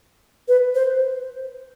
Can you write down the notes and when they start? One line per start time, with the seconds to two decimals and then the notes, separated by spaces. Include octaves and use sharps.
0.48 B4
0.75 C5